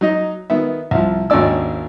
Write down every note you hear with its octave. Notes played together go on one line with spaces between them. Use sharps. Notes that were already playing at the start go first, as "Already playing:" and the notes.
F#3 D#4 D#5
D#3 B3 E5
C2 F3
G#1 D#2 C#4 D4 D5 E6